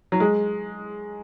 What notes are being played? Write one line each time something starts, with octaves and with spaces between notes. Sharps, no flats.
F#3
G#3